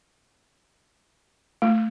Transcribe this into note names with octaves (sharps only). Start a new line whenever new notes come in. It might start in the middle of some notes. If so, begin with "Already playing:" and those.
A3